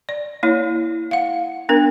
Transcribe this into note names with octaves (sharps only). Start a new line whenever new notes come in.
D5
A#3 E4 C#5
F5 F#5
B3 D4 A#4